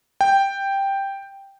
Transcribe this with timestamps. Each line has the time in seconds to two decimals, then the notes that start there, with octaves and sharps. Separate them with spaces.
0.21 G5